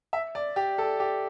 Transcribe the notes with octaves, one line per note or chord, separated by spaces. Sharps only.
E5
D5
G4
A4
G4